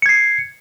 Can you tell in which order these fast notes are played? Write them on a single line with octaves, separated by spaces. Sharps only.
C#7 G#6 C7